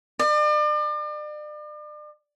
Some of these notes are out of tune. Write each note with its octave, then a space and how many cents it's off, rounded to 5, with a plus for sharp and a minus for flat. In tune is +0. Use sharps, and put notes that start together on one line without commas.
D5 +40